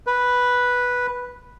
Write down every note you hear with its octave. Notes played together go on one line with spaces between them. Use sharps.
B4